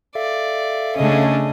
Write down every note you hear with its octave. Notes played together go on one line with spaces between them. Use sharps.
A4 D5 E5 F5
C#3 A3 C#4 D4 G#4 D#5